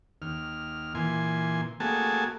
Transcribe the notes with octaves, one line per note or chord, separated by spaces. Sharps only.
D#2 F6
A#2 E3 G#5 C6
A3 A#3 F#4 G#4 G#5 A5